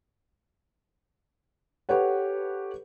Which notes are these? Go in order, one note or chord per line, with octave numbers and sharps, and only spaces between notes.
G4 A4 B4 C#5 F#5